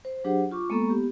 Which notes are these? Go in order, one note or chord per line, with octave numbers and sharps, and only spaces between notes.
C5
F#3 D4 G4 G#4 C5 F#5
F4 C#6 D6
G#3 A#3 B3 A4 A#5 C#6
B3 G4